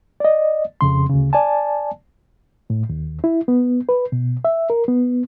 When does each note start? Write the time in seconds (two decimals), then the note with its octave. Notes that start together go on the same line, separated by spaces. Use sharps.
0.20 D5 D#5
0.81 F2 C#3 C6
1.09 D2 C#3
1.33 D5 G#5 A5
2.70 A2
2.89 D#2
3.24 E4
3.48 B3
3.89 B4
4.12 B2
4.45 E5
4.70 A#4
4.88 B3